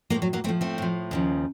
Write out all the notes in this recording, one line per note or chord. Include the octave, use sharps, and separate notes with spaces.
A2 F3 F#3 A#3
F#3
F#3 A#3
A2 F3 A3 C4
A3 C4
A2 F3
D#2 C#3 F3